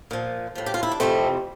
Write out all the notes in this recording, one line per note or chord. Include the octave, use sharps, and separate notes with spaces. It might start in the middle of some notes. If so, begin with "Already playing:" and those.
A#2 F3
A2 F3
G4
F4
E4
D4
F2 C3 E3 G3 A3 C4